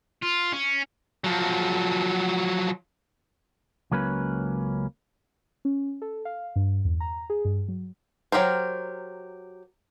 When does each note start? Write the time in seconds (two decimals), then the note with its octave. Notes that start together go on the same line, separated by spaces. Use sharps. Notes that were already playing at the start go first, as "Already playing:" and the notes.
0.23 F4
0.53 C#4
1.24 F3 F#3
3.91 C#2 F#3 A#3 C#4 B4
5.65 C#4
6.02 A4
6.25 F5
6.56 G2
6.85 E2
7.00 A#5
7.30 G#4
7.45 G2
7.68 F#3
8.32 F#3 G4 A#4 C5